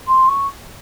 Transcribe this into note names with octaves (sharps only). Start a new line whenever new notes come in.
C6
C#6